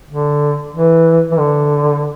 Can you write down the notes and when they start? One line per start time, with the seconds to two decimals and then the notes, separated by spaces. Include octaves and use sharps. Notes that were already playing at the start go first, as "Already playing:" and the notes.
0.09 D3
0.74 E3
1.31 E3
1.39 D3